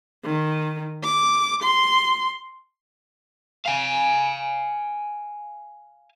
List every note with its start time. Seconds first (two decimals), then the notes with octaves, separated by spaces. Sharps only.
0.25 D#3
1.03 D6
1.63 C6
3.66 F5 G#5